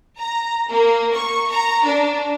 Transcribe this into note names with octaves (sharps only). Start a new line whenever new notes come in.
A#5
A#3
C#6
A#5
D4